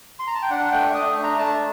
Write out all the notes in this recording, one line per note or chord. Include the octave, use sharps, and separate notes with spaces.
C6
A#5
A5
G5
D4 F#5
A3 G5
A3 D#6
D4
A#5
A3 A5